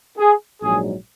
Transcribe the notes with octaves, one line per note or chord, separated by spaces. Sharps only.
G#4
A#1 G#2 F#3 D4 G#4